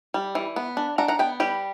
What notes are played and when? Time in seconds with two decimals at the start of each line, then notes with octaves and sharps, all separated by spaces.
0.14 G3
0.35 E3
0.56 B3
0.77 D4
0.98 D4 F#5 A#5
1.08 F#5 A#5
1.19 B3 G5 B5
1.40 G3 G4 B4